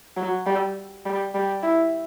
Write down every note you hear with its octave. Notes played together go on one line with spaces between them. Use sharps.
F#3
G3
G3
G3
E4